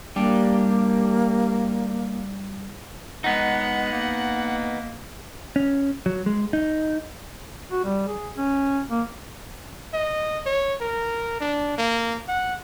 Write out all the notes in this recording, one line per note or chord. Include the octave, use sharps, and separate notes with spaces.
G3 A#3 D4 G4
G#3 B3 D#4 F#5
A#3
C#4
F#3
G#3
D#4
F#4
G3
G#4
C#4
A#3
D#5
C#5
A#4
D4
A#3
F#5